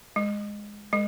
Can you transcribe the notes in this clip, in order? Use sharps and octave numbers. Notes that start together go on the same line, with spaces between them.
G#3
G#3